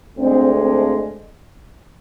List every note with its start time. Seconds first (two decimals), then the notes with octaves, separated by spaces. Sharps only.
0.18 D2 D3 G#3 C4
0.61 C4